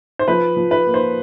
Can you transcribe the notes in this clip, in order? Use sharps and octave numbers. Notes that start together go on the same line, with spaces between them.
C5
F3 B4
F3
B4
A#3
C5